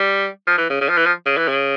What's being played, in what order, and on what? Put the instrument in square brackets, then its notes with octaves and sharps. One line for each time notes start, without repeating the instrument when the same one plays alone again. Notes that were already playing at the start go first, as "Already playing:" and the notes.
Already playing: [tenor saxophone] G3
F3
E3
C#3
C#3
F3
E3
F3
C#3
E3
C#3